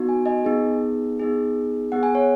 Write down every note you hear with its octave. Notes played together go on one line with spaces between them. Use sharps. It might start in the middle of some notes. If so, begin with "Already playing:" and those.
Already playing: B3 D#4 F#4
G#5
D#5 G#5
B3 D#4 G#4
B3 D#4 G#4
B3 G#4 F#5
G#5
C#5 F#5